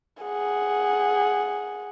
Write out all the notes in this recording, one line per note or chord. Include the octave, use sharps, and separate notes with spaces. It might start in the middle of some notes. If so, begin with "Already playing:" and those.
G#4 F#5